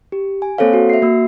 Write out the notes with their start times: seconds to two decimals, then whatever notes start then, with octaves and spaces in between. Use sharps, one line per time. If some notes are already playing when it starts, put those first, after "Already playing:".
0.12 G4
0.42 G#5
0.58 A#3 C4 A4 C5 C#5 F5
0.73 F#4
0.89 E5 C7
1.02 A#3 F#4 E6